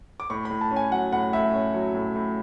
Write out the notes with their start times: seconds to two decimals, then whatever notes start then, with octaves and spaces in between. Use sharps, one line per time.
0.20 D6
0.30 A2 C#6
0.45 B5
0.51 A2
0.61 A5
0.71 C#4
0.76 G#5
0.91 F#3 F#5
1.12 A2 F#5
1.33 A2 E5
1.54 C#4
1.74 F#3
1.94 A2
2.16 A2